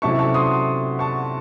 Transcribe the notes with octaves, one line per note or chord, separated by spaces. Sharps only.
C3 F#3 A3 C#4 E4 A5 C#6
A5 C#6
C6 D#6
A5 C#6